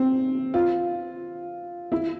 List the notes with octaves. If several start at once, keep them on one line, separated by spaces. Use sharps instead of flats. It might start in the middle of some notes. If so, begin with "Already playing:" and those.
Already playing: C4
F4
E4